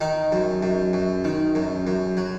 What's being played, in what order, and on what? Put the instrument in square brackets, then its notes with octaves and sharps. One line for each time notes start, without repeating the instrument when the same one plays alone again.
[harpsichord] D#3 D#4
F#2
F#2
F#2
D#3
F#2
F#2
F#3